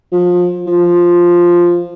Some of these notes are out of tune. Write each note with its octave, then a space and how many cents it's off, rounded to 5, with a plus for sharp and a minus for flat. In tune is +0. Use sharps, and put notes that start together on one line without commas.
F3 +25
F3 +0